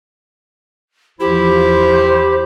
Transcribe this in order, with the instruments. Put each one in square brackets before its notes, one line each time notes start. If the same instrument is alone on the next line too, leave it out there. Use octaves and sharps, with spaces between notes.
[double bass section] E2 F3 [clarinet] E4 [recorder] G4 [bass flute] C5